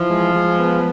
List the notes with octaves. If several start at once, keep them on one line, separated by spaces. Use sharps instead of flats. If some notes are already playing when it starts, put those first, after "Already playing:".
Already playing: E3 F3
G#3
G#3
B3